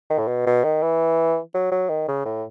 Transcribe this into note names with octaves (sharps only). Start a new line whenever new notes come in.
D#3
A2
B2
B2
D#3
E3
F#3
F#3
D#3
C#3
A2